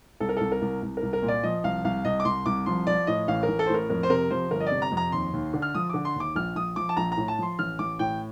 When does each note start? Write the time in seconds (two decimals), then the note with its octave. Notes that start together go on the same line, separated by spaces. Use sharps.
0.20 C2 A4
0.29 A#4
0.37 C2 A4
0.52 A#4
0.62 C2
0.83 C2
0.97 A#4
1.03 C2
1.13 A#4
1.22 A#2
1.28 D5
1.43 F3 D#5
1.64 C2 F5
1.84 C2 F5
2.05 C2 D#5
2.20 D6
2.25 C2 C6
2.46 C2 D6
2.66 F3 C6
2.87 F3 D5
3.07 A2 D#5
3.28 A1 F5
3.43 A#4
3.48 A1
3.59 A4
3.66 C5
3.69 A2 A#4
3.90 F2 A#4
4.03 C5
4.09 C3 A#4
4.31 F3 C5
4.51 G1 A#4
4.60 D#5
4.67 C3 D5
4.82 A#5
4.92 F2
4.97 A#5
5.12 D#2 C6
5.33 D#2
5.54 D3
5.62 F6
5.75 F3 D#6
5.90 D3 D6
6.05 C6
6.15 D#2 D6
6.36 A#1 F6
6.56 A#1 D#6
6.76 F3 D6
6.89 A5
6.97 A#1 A#5
7.12 A#5
7.17 A2
7.28 A5
7.38 F3 C6
7.59 A1 F6
7.79 A1 D6
7.99 A2 G5